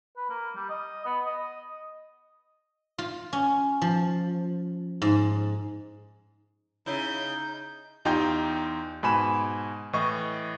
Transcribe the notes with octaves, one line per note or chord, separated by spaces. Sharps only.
B4
A#3
G3
D#5
B3
D#5
F4
C#4
F3
G#2
C#3 D#4 E4 G6
E2 D#4 F4 G4 G5 G6
G#2 B2 G#5 B5 E7
A2 E3 D#5 C#6